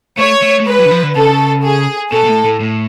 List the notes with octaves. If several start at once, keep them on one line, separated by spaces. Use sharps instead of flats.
A3 C#5
A3
A3
G#3 B4
F#3
D3
F3
D3
C#3 A4
G#4
B2 A4
B2
A2
A2
A2